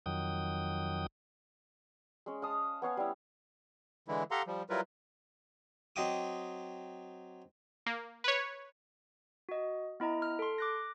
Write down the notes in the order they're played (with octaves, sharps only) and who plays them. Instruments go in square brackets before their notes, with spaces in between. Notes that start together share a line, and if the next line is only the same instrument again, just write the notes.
[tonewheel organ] F2 D#3 F#3 G5 D#6
[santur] G#3 C#4
F5 A5 D#6
B3 C#5 F5 G#5
G3 C#4 E4
[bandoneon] D3 E3 G#3 E4
G4 A4 F5 F#5 A#5 C6
F3 G3
F#3 G3 E4 F4 A#4 B4
[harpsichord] F#3 C4 D#5 G5 D6 D#6
[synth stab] A#3
B4 C#5
[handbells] F#4 D#5
B3 E4 D#5 A#5
F6
A4 C6
D6 F#6 A#6